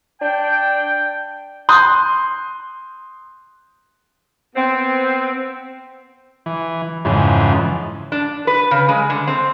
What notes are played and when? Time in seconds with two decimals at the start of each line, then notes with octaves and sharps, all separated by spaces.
0.21 D4 G5
1.69 C6 D#6 F#6 G6
4.56 B3 C4
6.46 E3
7.05 F2 G#2 C#3 E3
8.12 D4
8.47 B4
8.71 C#3
8.89 G#3
9.10 D3
9.28 C4